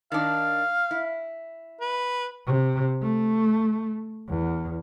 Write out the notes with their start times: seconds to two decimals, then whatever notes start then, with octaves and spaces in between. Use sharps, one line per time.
0.12 D#3 D4 F5
0.91 E4
1.80 B4
2.46 C3
3.02 A3
4.29 E2